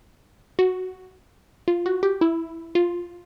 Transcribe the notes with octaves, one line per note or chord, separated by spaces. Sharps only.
F#4
F4
F#4
G4
E4
F4